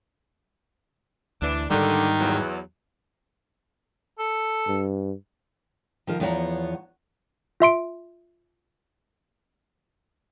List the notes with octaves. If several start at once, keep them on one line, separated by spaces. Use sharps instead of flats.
D2 E3 D4
G#2 D3 D#3 G3
E2 F#3
A4
G2
D#3 F3 A#4
E2 F3 B3 C#5 F#5 A#5
F4 E5 C6 D7